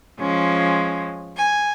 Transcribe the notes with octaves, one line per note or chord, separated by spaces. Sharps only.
F3 G#3 C#4
G#5